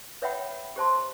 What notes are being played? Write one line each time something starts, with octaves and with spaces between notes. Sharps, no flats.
B4 C#5 E5 F#5 G5 B5
G4 C5 A5 C6